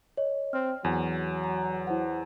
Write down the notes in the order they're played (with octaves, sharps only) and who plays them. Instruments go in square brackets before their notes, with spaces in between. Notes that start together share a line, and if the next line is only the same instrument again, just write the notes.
[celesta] C#5 D#5
[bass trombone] C4 [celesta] F6
[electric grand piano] E2 [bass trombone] F#3 [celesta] G#5
[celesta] A#5
E4 C5 F#5